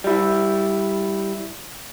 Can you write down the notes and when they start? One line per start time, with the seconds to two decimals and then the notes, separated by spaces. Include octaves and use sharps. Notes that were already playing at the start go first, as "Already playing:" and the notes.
0.04 G3 E4